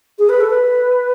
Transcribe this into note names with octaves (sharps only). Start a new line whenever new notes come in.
G#4
B4
A4
B4